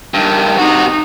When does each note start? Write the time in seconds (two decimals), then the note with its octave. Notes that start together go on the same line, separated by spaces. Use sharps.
0.14 G2 D#3
0.58 C3 D#4 F#4